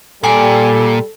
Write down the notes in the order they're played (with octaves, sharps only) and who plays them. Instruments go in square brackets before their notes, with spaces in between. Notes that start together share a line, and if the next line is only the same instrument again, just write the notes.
[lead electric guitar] A#2 [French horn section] G3 [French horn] A4 [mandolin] G#5 D6